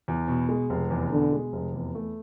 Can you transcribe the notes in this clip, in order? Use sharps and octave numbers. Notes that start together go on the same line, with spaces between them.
E2
B2
G#3
F1
E2
B2 D3
G#3
F1
E2
A3